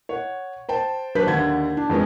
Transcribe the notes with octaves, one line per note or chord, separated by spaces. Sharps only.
C#5 F#5
C5 G5 A5
F#3 D4 B4 C5 G6 B6
D#2 D3 F#5 G#6
D4
F2 G#3 B3 C#4